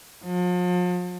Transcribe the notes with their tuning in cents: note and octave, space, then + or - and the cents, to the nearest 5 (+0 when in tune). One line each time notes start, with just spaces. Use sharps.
F3 +40